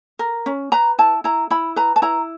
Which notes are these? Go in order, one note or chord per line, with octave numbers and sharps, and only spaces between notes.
A#4
C#4
B4 A#5
E4 A5
E4 A#5
E4 B5
B4 A#5
A5
E4 A#5